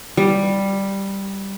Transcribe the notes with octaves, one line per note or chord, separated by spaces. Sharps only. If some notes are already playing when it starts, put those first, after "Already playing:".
G3